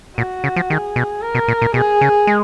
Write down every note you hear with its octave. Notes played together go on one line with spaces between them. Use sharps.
A#2 F#4
C#3
F3
D#3 G#4
B2
A#4
B2
A#2
A#2
B2 G#4
C#3
G#3